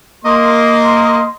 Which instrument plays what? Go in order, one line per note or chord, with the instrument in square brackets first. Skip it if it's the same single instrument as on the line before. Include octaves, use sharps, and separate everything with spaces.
[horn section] A#3 D#5 C6